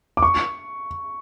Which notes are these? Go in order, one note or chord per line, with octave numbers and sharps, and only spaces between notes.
D6
C#6